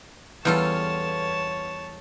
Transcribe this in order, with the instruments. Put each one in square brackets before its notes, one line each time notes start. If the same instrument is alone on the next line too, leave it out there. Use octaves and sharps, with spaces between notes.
[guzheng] E2 G3 A4 [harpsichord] B3 C#4 F4 [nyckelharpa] C#5 A5